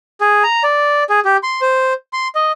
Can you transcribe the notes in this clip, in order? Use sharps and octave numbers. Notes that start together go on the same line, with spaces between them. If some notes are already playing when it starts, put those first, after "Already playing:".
G#4
A#5
D5
G#4
G4
C6
C5
C6
D#5